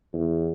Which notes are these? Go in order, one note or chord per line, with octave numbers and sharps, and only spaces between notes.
E2